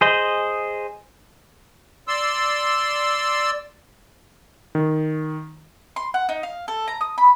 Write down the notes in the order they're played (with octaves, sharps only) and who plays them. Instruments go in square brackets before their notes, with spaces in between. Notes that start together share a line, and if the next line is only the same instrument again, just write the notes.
[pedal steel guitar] G#4 C5 D#5
[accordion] D5 C6 E6
[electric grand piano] D#3
[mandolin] C6
F#5
D#4
F5
A4
A#5
D#6
B5